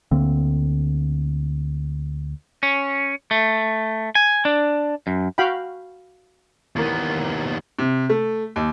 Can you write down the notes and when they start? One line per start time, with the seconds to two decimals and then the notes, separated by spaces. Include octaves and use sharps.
0.11 D2 D3 A#3 C4
2.63 C#4
3.31 A3
4.15 G#5
4.45 D4
5.07 F#2
5.38 F#4 F5 G5 B5
6.76 D#2 E3 A#3 B3
7.79 C3
8.09 A3
8.56 D#2